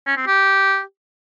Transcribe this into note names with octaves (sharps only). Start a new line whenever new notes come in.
C#4
C4
G4